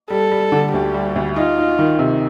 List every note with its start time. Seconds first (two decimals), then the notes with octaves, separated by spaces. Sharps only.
0.10 G3 A4
0.31 G3
0.52 D3
0.73 D2 G4
0.94 G3
1.16 D2
1.36 D#4 F4
1.58 D#4
1.79 D#3
1.99 C3